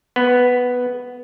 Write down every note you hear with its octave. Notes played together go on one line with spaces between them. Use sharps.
B3